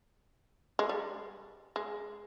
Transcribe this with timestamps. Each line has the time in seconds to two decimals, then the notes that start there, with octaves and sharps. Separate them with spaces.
0.79 G#3
0.89 G3
1.76 G#3